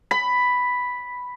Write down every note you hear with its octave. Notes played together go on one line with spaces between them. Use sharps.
B5